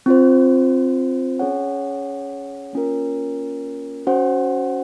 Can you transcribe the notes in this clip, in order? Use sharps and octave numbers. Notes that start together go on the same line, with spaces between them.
C4 F4 C5
C#4 G#4 C#5 F#5
A#3 C#4 F4 A#4
C#4 F#4 C5 F#5